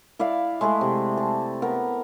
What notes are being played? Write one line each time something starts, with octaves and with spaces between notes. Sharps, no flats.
E4 D5 E5 F5
G#3 A3 E4 G#4
C3
A5
B3 A#4